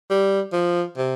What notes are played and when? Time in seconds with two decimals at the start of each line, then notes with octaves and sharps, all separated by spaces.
0.10 G3
0.53 F3
0.97 C3